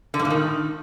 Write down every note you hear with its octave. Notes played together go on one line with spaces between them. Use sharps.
D3
G#2
A#2
D#3